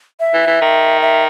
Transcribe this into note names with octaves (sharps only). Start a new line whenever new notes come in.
E5
E3
E3
D#3
E5